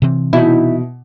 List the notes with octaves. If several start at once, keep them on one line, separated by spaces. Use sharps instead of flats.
C3 E3 C4
B2 D#4 E4